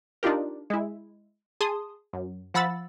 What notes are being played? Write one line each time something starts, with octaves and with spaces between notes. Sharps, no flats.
D4 D#4 F4 G4 A#4
G#3 E4
G#4 A5 C6 D#6
F#2
F3 F#5 B5 E6 A6